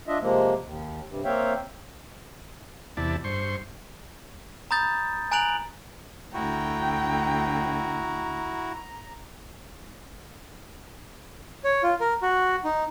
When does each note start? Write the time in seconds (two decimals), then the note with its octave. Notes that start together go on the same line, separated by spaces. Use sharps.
0.07 D4 F4 D#5 E5
0.21 C3 F3 G#3 A#3
0.63 D#2
1.08 G2 C3
1.24 A#3 C4 C#5 E5 F5 G5
2.97 E2 C3 E4 D5 A5
3.24 G2 C5 C6 C#6
4.71 A#5 B5 D#6 G6 A6
5.31 G#5 A#5 F#6 D7 F7 F#7
6.34 D2 E4 F#4 G5 A#5
11.64 C#5
11.83 F4
12.00 A#4
12.22 F#4
12.64 D#4